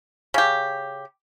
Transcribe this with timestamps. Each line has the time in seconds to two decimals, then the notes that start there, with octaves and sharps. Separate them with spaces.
0.34 C#3 G4